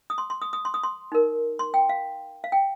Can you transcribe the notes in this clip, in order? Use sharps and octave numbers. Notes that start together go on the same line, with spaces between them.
D#6
C6
C6
D#6
D#6
C6
D#6
C6
D#4 A#4
C6
G5
F5
F5
G5